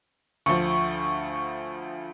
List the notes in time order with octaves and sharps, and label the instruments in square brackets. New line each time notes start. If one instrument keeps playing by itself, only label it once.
[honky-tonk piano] D2 F3 [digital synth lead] C#6